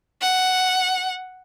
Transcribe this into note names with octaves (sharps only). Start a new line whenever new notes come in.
F#5